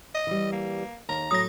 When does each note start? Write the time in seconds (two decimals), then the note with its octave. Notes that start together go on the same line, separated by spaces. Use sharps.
0.15 D#5
0.27 E3 G3
0.52 A#3
1.09 D#2 A#5
1.31 A2 F#3 D#6 A#6